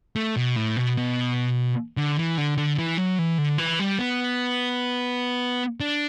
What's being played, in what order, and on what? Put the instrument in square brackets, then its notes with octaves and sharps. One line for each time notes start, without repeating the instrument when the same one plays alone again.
[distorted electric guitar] A3
B2
A2
B2
B2
D3
E3
D3
D3
E3
F#3
E3
D3
E3
G3
B3
D4